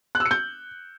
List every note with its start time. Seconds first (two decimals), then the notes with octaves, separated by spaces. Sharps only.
0.15 F#6
0.20 E6
0.25 C#7
0.31 G6